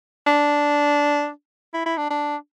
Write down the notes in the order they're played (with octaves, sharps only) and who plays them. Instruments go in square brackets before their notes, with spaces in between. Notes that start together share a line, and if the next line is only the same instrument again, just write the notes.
[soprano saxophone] D4
E4
E4
D4
D4